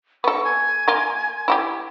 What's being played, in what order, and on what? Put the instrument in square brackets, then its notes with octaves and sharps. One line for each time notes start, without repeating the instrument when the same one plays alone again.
[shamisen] B3 A4 [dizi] C#6
[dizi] G#5
[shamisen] A#3 F4
E4 F#4 G4